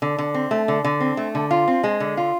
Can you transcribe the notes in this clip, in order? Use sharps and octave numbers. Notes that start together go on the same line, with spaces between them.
D3
D3
C4
A3
D3
D3
C4
A3
D3
F4
C4
G#3
D3
F4